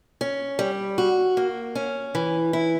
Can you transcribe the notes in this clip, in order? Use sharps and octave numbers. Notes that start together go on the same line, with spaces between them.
C#4
G3
F#4
A#3
C#4
E3
E4